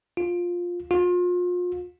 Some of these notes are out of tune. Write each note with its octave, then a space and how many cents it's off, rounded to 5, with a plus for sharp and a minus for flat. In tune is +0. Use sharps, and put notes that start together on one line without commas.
F4 +10
F4 +35